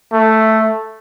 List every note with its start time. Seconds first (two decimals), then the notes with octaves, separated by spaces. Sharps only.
0.12 A3